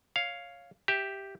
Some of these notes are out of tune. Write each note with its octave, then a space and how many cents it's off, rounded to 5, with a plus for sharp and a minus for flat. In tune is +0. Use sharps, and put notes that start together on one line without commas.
C#5 +5 F5 +0
G4 +0 E5 +0